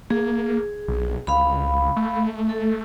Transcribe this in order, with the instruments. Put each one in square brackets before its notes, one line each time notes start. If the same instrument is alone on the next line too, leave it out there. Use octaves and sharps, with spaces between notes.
[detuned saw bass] A#3 [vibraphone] G#4
[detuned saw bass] B1
[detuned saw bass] C#2 [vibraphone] F5 B5
[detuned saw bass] A3
[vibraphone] A4